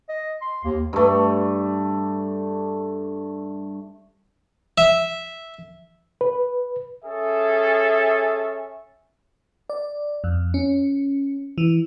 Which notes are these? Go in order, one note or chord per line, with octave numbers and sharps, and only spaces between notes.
D#5
C6
D#2 A#3
G2 A3
E5
B4
C#4 G#4 A4 E5
D5
F2
C#4
E3